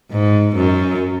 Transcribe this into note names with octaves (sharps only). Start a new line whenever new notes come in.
G#2
F#2